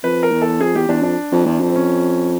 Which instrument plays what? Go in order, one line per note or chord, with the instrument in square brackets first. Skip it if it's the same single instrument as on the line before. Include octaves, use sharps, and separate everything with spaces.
[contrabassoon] F2 [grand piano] B4
[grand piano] A#4
[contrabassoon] E2
[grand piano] A4
[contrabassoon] F2 [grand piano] G#4
[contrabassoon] E2 [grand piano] G4
[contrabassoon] E2 [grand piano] D4
[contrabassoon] F2 [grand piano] D4
[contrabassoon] F2
E2
F2
[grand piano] C4
C#4